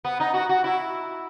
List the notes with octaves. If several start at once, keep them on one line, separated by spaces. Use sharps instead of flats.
B3
D#4
F#4
F#4
E4